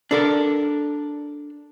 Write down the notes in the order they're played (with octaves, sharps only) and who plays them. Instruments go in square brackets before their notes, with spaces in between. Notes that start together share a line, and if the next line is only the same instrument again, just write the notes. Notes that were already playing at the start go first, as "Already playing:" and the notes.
[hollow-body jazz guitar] D4 A4 A#4